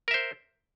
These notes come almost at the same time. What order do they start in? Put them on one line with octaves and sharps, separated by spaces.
A#4 E5 C5